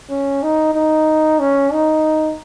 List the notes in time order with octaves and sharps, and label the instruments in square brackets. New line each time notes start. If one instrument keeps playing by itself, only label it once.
[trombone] C#4
D#4
D#4
C#4
D#4